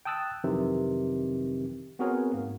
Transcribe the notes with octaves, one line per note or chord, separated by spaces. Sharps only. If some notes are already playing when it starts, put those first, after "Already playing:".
G5 A5 D#6 E6 F#6 A6
F2 C3 D#3 E3 F#3
B3 C4 F#4 G#4 A#4 C#5
G#2 A#3